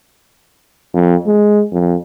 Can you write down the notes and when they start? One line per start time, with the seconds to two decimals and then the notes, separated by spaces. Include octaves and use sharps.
0.95 F2
1.27 G#3
1.72 F2